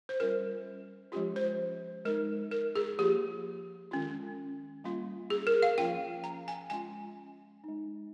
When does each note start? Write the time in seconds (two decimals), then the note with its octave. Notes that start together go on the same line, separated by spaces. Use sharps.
0.09 C5
0.20 G3 C#4 F4 A#4
1.12 F3 G#3 C#4 F4 G4
1.36 C5
2.05 G#3 D#4 A#4
2.51 A#4
2.76 G#4
2.99 F3 A#3 F4 G4
3.91 D#3 G#3 C#4 F4
4.84 G3 A#3 C#4 F4
5.30 G#4
5.47 A#4
5.62 F5
5.78 F3 A#3 C#4 F4 G5
6.24 A#5
6.48 G#5
6.70 G#3 C#4 F4 G#5
7.64 G#3 D#4